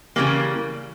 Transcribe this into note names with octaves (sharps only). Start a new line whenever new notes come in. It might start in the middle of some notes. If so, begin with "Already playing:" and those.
C#3 E3 G3 A#3